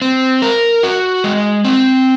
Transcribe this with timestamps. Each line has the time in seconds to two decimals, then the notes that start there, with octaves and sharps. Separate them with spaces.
0.02 C4
0.42 A#4
0.83 F#4
1.24 G#3
1.65 C4